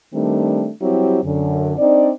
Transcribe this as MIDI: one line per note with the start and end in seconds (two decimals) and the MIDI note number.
0.13 0.69 51
0.13 0.69 55
0.13 0.69 57
0.13 0.69 60
0.13 0.69 62
0.81 1.19 54
0.81 1.19 55
0.81 1.19 60
0.81 1.19 64
0.81 1.19 67
1.24 1.73 42
1.24 1.73 50
1.78 2.11 60
1.78 2.11 62
1.78 2.11 63
1.78 2.11 74